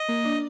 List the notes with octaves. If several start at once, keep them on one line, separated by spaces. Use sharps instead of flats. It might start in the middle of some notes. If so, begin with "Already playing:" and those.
Already playing: D#5
A#3
D4